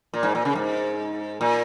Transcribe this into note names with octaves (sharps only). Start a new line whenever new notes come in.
A#2
G#2
A#2
C#3
G#2
A#2